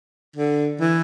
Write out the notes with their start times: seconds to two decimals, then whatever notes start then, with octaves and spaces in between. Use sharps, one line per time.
0.36 D3
0.80 E3